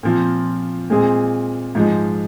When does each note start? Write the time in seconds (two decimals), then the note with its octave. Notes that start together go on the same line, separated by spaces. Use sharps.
0.03 A#2 F3 C4 F4
0.90 A#2 G#3 C4 F4 G#4
1.75 G#2 F3 G#3